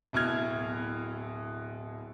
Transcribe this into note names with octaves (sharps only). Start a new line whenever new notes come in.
D1 B2 E4 F6 G#6